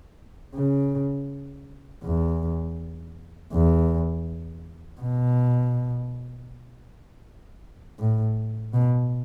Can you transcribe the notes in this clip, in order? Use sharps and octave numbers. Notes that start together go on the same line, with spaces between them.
C#3
E2
E2
B2
A2
B2